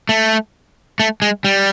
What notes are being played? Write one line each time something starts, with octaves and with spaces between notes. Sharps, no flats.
A3
A3
G#3
G3